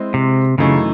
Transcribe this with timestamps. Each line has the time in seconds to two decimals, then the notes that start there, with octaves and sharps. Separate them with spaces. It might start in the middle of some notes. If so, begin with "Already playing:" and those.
Already playing: G#3 C4 E4 C5 D#5
0.14 C3
0.58 F#2 C#3 E3 A3 D#4